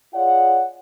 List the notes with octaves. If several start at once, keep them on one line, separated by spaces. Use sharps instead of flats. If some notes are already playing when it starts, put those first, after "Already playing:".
F4 G#4 C#5 D5 F#5